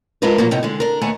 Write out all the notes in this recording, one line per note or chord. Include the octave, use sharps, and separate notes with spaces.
G#3 D4 E4 F4 A#4 B4
A#2 F3 F#3 A#3
A2 C3 D#4
D3 G#3
D4 A#4
D#2 A3 B3 A#4 C#5 G#5